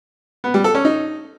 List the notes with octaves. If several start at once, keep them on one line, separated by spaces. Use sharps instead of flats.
B3
G3
A4
C#4
D#4